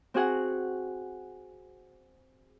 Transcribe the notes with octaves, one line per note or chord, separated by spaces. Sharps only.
C4 F#4 G#4 F#5